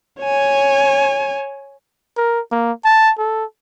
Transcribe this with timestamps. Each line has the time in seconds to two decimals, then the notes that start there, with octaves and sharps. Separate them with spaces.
0.22 C#5 G#5
2.17 A#4
2.51 A#3
2.85 A5
3.18 A4